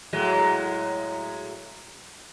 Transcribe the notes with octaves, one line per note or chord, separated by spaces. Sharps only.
A2 F#3 G#3